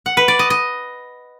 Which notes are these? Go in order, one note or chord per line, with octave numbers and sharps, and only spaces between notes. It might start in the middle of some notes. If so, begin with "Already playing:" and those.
F#5
B4
D5
D#5
D#5